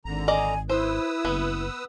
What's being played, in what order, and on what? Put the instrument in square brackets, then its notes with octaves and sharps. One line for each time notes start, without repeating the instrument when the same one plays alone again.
[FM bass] G#1 [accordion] D3 A#5
[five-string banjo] D5 D#5 [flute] G#5
[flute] E4 [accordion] B4 D#6 E6 [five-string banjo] C5
[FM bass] F#1 [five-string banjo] B3